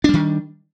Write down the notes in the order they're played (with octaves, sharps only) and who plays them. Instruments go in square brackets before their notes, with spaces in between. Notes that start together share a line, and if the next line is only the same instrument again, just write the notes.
[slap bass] D4
G3
D#3